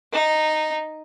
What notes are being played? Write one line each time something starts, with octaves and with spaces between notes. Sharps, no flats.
D#4